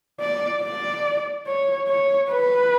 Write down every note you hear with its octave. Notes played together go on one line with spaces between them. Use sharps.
D5
D5
C#5
C#5
B4